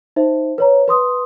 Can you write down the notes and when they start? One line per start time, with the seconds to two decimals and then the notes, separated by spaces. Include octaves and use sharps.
0.16 D#4 C5 E5
0.58 B4 C#5 A#5
0.88 B4 C6 D#6